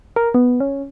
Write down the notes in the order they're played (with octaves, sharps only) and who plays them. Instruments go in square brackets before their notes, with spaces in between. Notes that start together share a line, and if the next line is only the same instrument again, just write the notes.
[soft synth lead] A#4
B3
C#4